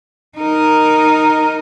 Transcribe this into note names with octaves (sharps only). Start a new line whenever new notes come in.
D#4 A#4